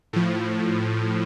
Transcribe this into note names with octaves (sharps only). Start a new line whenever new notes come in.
A2 F3